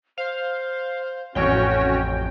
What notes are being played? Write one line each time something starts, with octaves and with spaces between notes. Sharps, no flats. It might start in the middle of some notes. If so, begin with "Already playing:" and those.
C5 F5
A1 F2 C#4 F#4 C#5 G5